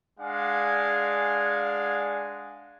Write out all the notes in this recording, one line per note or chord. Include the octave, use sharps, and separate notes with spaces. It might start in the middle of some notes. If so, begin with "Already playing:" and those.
G#3 D4 F5 F#5 G#5